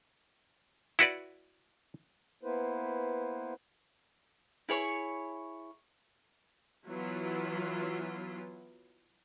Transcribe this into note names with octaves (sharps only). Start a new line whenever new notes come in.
E4 F#4 B4 D5
A#3 B3 E4 B4 C5
E4 G#4 C#5 C#6
E3 F#3 B3 E4 F4